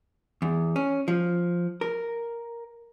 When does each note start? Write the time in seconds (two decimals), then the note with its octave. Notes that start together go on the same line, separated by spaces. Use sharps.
0.42 E2
0.76 C#4
1.08 F3
1.81 A#4